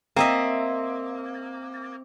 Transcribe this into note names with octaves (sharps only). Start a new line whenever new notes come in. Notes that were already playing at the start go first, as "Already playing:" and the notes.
A#3 C4 D#5 E5